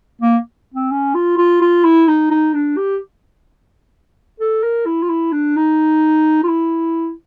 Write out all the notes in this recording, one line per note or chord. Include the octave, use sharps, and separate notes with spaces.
A#3
C4
C#4
F4
F4
F4
E4
D#4
D#4
D4
G4
A4
A#4
E4
F4
E4
D4
D#4
F4
E4